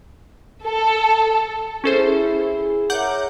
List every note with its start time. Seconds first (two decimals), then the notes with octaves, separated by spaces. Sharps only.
0.63 A4
1.84 C#4 E4 G#4 A4 C5
2.90 A#4 C#5 E5 F#5 D6 G6